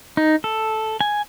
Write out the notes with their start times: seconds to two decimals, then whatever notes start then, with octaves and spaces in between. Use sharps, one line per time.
0.17 D#4
0.44 A4
1.01 G#5